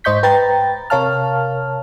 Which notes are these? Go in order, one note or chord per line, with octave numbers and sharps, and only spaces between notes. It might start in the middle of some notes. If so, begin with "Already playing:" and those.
G#2 C5 D#5 C#6 G6 B6
B4 G5 A#5 A6
C3 A#4 C#5 F5 A5 F6